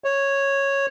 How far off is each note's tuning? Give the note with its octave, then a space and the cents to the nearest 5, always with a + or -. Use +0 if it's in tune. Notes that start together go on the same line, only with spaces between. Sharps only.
C#5 -5